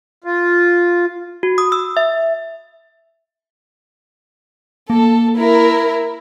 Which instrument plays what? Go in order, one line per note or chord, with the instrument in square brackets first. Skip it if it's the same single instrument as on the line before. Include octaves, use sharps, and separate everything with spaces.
[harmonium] F4
[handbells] F#4
D#6
E6
E5
[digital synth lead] A#3 [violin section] A4
[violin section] E4 A#4